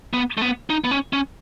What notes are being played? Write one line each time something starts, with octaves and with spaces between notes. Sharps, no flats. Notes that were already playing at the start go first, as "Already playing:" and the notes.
B3
A3
B3
D#4
B3
C#4
C#4